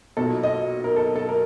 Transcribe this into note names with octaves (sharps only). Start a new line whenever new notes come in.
B1 A#2 F#3 A4
D#5
A#4
A4
A4
A#4